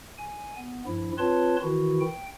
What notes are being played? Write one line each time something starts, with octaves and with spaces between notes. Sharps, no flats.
G#5
B3
G2 F3 E4
C4 F4 B4 C#5 A5 C6
D#3 E3 E4 F#4
G5